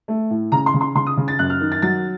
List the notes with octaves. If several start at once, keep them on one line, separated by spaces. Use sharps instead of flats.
A3
A2
C#3 A#5
C6
C#3
C6
C#3 C6
D#6
C#3
A6
F#2 F#6
F6
D#3
A6
F#3 A6